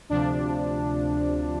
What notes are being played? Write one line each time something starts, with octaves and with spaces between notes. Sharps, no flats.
D2 C3 F3 D4